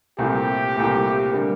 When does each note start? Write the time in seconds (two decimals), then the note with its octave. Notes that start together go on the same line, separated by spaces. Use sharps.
0.18 C2 A#2 A3 C4 G4
0.76 C2 A#2 A3 C4
1.33 D3 G3 A#3